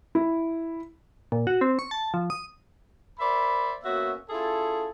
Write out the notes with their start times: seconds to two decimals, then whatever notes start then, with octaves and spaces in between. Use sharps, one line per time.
0.15 E4
1.32 A#2
1.47 F#4
1.61 C4
1.79 C#6
1.91 A5
2.14 F3
2.30 D#6
3.19 A#4 C5 D5 E5 B5
3.84 A#3 B3 C#4 F#4 C#5 E5
4.30 C#4 E4 F4 G#4 A4